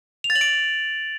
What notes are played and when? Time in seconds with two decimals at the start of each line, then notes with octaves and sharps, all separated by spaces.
0.24 F7
0.30 A6
0.35 F#7
0.41 D7